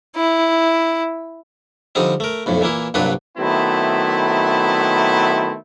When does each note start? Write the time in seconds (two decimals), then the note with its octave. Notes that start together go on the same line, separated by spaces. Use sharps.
0.16 E4
1.95 D3 F3 G3 C4 D#4
2.20 A3 A#4
2.46 B1 F2 A2
2.61 A#2 E3 A#3 E4
2.94 C2 G2 A#2 F#3 D4 B4
3.37 D#3 F#3 A3 B3 C4 E4